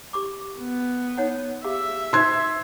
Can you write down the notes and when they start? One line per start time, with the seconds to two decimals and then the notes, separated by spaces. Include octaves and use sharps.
0.13 G4 C#6 D6
0.60 B3
1.17 D#4 C#5 F#5
1.64 G4 G#4 E5 F5
2.13 D#4 C5 C6 G#6